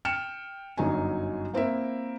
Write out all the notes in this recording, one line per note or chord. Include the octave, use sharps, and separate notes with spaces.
G5 F6 C#7 E7
G1 F#2 F#3 D#4 G#5
A#3 C4 E4 A#4 E5